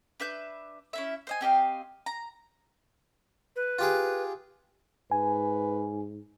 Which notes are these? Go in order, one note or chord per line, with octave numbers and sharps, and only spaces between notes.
D4 B4 E5 G6
C#4 E4 E5
C5 D#5 G#5
C4 G4 D#5 F5
A#5
B4
F4 G4 G#4
G#2 B4 G#5